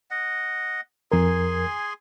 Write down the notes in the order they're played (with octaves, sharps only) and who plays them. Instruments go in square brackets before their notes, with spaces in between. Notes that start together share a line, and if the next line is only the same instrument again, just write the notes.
[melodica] D#5 F#5
[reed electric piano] F2 A#4 [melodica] G#4 G#5 C6